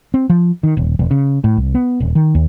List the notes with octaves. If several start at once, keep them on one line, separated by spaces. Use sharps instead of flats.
C4
F3
D#3
D#1
E1
C#3
A2
C2
B3
D#1
D#3
D#2